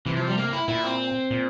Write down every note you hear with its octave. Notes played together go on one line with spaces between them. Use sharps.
C3 E3
F3
G3
A#3
E4
A#2 E4
C4
A#2